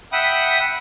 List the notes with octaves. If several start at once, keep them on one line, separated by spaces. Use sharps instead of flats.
E5 F#5 G5 B5 D#6